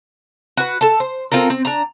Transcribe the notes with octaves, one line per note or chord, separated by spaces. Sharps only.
F#4 B4
A4 A5
C5
C4 F4 A4 A#4
C4
D4 A#5